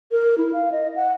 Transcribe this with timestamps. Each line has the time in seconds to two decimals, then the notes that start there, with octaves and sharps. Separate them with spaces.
0.12 A#4
0.38 E4
0.53 F5
0.72 D#5
0.96 F#5